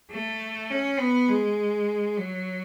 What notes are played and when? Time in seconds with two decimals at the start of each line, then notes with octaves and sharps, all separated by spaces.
0.11 A3
0.70 C#4
1.00 B3
1.28 G#3
2.17 F#3